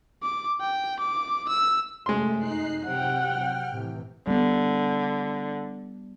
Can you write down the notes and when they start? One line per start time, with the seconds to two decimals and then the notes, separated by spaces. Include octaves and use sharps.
0.23 D6
0.61 G5
0.99 D6
1.48 E6
2.06 F#2 C3 G#3 A3 C6
2.38 D#4 F#6 C7
2.86 C3 F#3 F#5 G5 F6
3.71 A2 C3 E3
4.27 D3 G3 B3